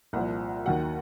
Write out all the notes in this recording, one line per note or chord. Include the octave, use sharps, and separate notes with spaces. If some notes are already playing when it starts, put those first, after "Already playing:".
C2 A#2 F3 F#5
D#2 D#3 F#3 F#5